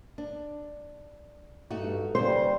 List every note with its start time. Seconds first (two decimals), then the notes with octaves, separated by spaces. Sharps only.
0.18 D4
1.70 G2 A3 D#4 F#4
2.15 D#2 A2 C#3 G3 C5